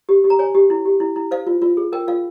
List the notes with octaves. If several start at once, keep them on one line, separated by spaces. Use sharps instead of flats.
G4
G4
A#5
C#5 G#5
G4
E4
G4
E4
E4
C5 F5
F4
F4
G#4
A#4 G5
F4 F5